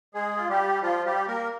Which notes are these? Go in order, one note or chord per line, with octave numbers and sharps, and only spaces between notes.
G#3 G#4
F4
G3 G4
F3 F4
G3 G4
A#3 A#4